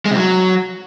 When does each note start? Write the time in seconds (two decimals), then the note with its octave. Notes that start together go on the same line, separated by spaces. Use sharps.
0.05 G#3
0.11 C3
0.16 F#3